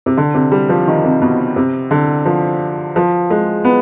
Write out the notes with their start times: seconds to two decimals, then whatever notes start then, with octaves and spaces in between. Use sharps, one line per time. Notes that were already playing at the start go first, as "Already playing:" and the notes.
0.06 C3
0.17 D3
0.35 C3
0.52 G3
0.69 F3
0.88 D#3
1.05 C3
1.22 B2
1.56 C3
1.91 D3
2.25 F3
2.96 F3
3.30 G#3
3.65 B3